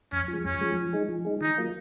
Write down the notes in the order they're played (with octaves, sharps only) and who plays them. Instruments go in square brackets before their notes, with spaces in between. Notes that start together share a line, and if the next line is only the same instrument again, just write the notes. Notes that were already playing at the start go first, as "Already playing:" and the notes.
[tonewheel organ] F2 [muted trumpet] C#4
[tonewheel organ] F3
G#3
[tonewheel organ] F2 [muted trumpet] C#4
[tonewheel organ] F3 G#3
F3
G#3 D#4 G#4
F3
G#3 D#4 G#4
[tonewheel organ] D#3 [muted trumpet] D#4
[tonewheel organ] F#3 A#3 F4